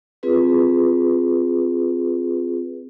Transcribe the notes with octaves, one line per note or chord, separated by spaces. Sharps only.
C4 F4 G#4 B4